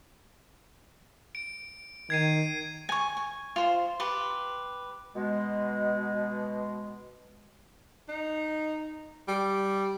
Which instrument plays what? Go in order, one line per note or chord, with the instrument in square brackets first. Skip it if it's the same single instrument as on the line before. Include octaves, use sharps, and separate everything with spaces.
[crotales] D7
[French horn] D#3 [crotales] G#6 C7 D#7
[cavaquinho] G#5 C#6
G#5
F4 C5
G4 B4 C6
[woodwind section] B2 G#3
[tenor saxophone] D#4
G3